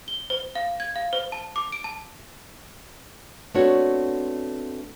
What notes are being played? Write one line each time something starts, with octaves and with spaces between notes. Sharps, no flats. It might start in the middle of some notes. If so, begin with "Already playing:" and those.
G7
C5
F5
G#6
F5
C5
A5
D6
D7
A5
A3 B3 C4 D4 F#4 C#5